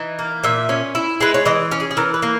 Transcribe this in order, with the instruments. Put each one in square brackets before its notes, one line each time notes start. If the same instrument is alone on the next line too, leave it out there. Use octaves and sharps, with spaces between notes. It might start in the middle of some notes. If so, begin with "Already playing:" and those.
Already playing: [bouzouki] E3 D#4
A#3
A#2 E5
C#4
E4
G#3 B4
C#5
E3 D#5
C#4
G#4
G#4
E3 A#4
B4
A#3